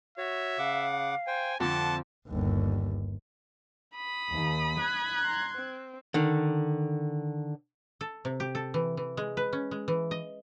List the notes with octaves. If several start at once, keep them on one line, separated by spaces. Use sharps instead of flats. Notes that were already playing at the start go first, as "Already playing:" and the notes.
F#4 C#5 E5
C#3 F5 F#5 D6
C5 G5 G#5
F2 D3 C4 F#5 A5 C6 D6
G1 D#2
B5 D#6
D#2
F#6 G#6
A#5 C6
C4
D3 D#3
A4
C3
G4
A4
E3
E3
G#3
B4
C#4
G#3
E3
D#5